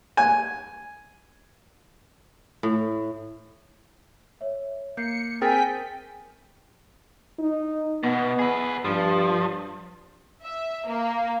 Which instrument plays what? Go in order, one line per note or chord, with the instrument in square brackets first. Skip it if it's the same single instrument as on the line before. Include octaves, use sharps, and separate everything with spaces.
[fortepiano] G#5
[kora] A2
[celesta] C#5 E5
[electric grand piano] A#3 [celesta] G6 C7 [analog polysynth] C#7
[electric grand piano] C4 G#4 A#4 [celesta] C5 A6 [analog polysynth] G5 B6 [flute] G#5
[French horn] D#4
[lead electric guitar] B2 [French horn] B3
[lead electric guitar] G#4 B4
[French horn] G2 [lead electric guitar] F3
[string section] E5
A#3